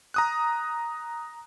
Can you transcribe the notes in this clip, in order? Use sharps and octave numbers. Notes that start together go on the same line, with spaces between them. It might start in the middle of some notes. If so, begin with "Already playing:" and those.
A#5 D#6 F#6